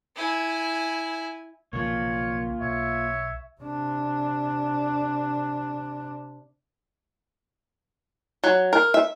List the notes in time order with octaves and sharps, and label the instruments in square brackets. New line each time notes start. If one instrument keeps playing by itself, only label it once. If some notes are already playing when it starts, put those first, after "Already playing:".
[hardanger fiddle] E4 G#5
[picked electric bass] B1 C#3 F3 [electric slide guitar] A#3 F4 [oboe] C#5
[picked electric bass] B1 [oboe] C#5 [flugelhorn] E5
[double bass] C3 D4
[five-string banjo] F#3
A#4
E5